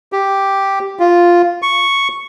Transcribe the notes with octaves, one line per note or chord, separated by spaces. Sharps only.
G4
F4
C#6